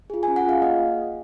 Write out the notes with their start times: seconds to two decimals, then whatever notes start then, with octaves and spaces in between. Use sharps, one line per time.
0.10 F4 G#4
0.23 C#4 G#5
0.36 F#5
0.44 F4 G#4 F5
0.62 A#3 D#5